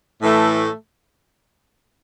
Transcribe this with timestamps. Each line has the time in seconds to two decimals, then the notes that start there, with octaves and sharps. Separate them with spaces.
0.22 A2 E3 A3